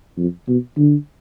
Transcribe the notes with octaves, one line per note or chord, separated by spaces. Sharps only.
F2
B2
D3